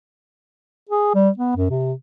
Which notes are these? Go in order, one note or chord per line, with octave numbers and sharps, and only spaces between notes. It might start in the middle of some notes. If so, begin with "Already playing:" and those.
G#4
G3
B3
F#2
C3